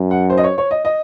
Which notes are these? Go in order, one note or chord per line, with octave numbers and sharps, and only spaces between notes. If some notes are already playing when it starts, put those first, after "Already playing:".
Already playing: F#2
F#5
C5
D#5
C#5
C#5
D#5
D#5